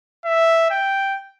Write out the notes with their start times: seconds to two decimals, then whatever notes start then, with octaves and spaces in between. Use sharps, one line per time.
0.25 E5
0.70 G5